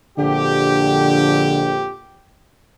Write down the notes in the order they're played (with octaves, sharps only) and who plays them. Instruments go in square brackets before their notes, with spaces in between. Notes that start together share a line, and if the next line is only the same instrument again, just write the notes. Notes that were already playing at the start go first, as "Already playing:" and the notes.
[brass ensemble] A#1 F2 G4 [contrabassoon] D3